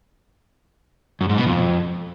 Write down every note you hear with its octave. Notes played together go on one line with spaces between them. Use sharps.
F#2
G#2
B2
F2